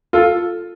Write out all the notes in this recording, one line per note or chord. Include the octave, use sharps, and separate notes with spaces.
F4 A4